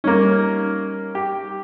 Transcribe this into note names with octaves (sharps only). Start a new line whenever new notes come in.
G3 A#3 C#4 D#4
G4